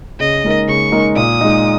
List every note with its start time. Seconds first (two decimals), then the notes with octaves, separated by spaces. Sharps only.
0.20 C#3 D#5
0.44 G#3 D#4 A#4
0.68 C#3 C#6
0.92 G#3 D#4 A#4
1.16 A#2 D#6
1.41 G#3 D#4